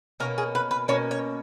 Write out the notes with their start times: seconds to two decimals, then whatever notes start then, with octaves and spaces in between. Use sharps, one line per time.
0.20 B2 A#3 C#4 A#4
0.38 G#4
0.55 B4
0.71 B4
0.88 B2 A#3 C#4 C#5
1.11 C#5